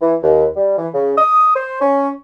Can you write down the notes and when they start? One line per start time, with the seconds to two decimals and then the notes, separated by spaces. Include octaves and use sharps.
0.01 E3
0.23 D#2
0.56 G3
0.78 E3
0.94 C#3
1.18 D#6
1.55 C5
1.81 C#4